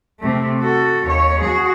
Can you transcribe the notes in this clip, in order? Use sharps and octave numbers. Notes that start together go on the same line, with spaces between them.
C3 A3
F#4 A4
D#2 C#5
F#4 G#4